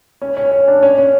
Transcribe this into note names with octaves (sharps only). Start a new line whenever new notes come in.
C#4
C#4
C#4
D4
C#4
C#4